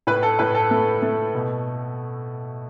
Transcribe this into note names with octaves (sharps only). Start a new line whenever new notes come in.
A2 B4
A4
A2 B4
A4
A3
A3
B2